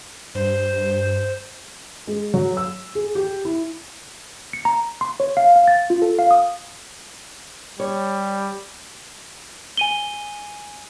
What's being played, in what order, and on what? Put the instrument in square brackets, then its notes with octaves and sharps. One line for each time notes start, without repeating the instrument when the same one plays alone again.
[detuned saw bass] G2 [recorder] C5
[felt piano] G#3
F#3
E6
G#4
G4
E4
[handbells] C#7
A#5
C6
C#5
F5
F5
A6
F4
A4
F5
D#6
[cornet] G3 [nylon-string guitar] C#5
[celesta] G#5 D#7 G7